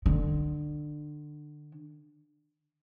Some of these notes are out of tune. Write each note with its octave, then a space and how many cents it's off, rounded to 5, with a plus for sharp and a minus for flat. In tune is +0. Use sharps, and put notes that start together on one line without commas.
D3 +25